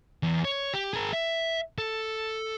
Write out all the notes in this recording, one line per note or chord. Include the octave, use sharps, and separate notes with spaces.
E2
C#5
G4
G#4 A#4
E5
A4